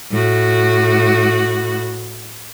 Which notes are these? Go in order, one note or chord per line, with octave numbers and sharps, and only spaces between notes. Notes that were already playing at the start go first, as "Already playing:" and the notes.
A2 F#4